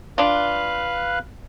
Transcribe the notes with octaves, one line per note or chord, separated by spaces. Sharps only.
D4 F4 B4 F5 F#6